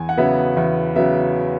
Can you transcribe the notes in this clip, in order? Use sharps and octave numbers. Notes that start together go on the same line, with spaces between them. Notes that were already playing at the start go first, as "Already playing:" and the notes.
Already playing: E2 G#5
F#5
C#3 F#3 B3 E5
E2 E5
C#3 F#3 B3 E5